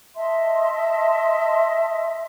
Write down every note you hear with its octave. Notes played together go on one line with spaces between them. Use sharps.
D#5 E5 A5 C6